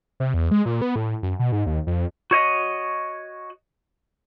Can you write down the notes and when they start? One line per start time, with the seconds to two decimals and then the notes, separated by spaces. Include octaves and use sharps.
0.20 C3
0.34 E2
0.51 G#3
0.66 A#2
0.82 B3
0.96 A2
1.23 F#2
1.39 B2
1.52 G#2
1.66 D#2
1.87 F2
2.31 F#4 C#5 D#5